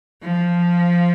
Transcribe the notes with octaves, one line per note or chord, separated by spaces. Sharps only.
F3